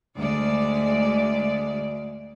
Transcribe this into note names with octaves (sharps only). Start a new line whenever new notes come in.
D2 G#3 D5